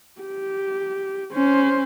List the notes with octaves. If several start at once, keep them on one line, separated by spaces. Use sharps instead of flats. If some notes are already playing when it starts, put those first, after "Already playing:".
G4
C#4 C5